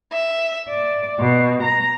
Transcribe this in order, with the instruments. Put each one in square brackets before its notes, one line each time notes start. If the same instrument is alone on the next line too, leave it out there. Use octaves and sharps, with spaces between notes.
[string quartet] E5
D5
B2
A#5